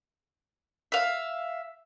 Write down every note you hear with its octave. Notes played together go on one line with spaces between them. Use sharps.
E5 F5